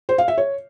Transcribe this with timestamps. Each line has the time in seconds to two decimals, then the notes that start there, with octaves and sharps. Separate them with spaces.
0.09 C5
0.18 F5
0.28 E5
0.38 C#5